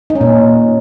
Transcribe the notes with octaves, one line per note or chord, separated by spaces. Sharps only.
D#4
C#4
A#2